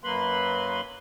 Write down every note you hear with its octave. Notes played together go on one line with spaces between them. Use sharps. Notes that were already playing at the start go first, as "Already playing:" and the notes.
F#2 F#3 A#3 B4 B5 C6